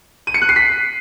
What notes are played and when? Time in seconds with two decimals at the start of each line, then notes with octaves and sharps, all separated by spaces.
0.27 D#7
0.34 C#7
0.42 F#6
0.49 C7
0.56 B6